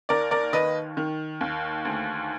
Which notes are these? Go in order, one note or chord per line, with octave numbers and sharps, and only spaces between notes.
D#2 A#4 D5
A#4 D5
D#3 B4 D#5
D#3
D#2
D2